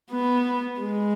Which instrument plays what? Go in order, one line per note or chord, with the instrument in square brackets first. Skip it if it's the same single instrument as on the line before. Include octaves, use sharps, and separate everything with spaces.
[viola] B3
G#3